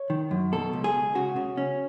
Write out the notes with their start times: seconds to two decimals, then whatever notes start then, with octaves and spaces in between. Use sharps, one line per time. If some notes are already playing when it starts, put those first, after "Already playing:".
Already playing: C#5
0.10 D#3
0.31 F#2
0.52 B2 A4
0.73 C#2
0.84 G#4
0.94 C#2
1.15 C#3 F#4
1.36 C#3
1.57 C#4